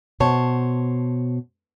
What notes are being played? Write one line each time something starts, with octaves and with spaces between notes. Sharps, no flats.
B2 C5 C#5 A5